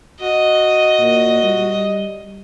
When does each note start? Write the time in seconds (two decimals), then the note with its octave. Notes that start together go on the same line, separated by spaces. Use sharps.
0.20 F#4 D#5
0.99 A#2
1.43 G3